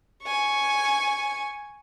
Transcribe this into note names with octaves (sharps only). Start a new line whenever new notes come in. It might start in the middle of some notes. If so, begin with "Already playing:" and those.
G#5 C#6